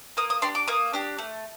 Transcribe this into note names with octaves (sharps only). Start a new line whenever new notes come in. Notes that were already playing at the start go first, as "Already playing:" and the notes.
A#3 D#6
D#6
D4 G4 C6
D6
A#3 D#6
D4 G4
A3